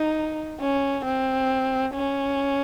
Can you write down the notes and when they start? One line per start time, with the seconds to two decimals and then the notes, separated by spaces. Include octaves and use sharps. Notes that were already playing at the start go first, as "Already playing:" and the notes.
Already playing: D#4
0.60 C#4
1.05 C4
1.95 C#4